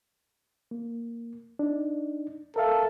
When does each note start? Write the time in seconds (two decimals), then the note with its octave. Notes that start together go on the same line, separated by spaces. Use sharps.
0.71 A#3
1.59 D4 D#4
2.56 A4 A#4 E5 F5